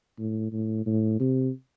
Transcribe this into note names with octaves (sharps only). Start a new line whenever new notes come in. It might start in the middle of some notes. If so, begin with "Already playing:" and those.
A2
A2
A2
C3